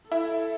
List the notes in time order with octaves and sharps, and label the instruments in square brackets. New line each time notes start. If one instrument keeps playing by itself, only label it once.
[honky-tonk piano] E4 [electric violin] A4